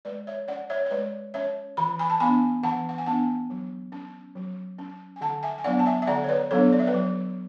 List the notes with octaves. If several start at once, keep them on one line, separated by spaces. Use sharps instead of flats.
G#3 B4 D5
C#5 E5
C#4 D5 F#5
C#5 E5
C#5
G#3 B4 D5
C#4 C#5 E5
E3 B5
G#5 B5
A5
B3 D4 G#5 B5
E3 F#5 A5
F#5
G#5
B3 D4 F#5 A5
F#3
C#4
F#3
C#4
G#5
D3 F#5 A5
E5 G#5
G#5
F#3 B3 D4 D5 F#5
A5
E5 G#5
E5
D3 D5 F#5
C#5
B4 D5
F#3 B3 D4 A4 C#5
D5
E5
B4 D5
F#3